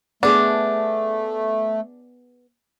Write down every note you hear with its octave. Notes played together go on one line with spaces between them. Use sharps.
A3 B3 D4 G#4